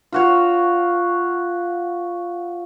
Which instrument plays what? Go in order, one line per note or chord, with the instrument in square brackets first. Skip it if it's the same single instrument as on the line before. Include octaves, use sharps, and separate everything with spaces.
[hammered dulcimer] F4 F#4 C#5